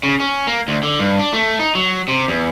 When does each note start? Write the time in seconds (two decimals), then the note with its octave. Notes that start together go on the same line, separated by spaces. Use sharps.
0.03 C#3
0.20 C#4
0.47 A#3
0.68 D2
0.83 D3
0.99 G2
1.20 D4
1.33 A3
1.59 D#4
1.75 F#3
2.08 C3
2.28 E2